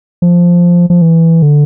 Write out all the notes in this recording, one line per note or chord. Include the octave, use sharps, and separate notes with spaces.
F3
F3
E3
D3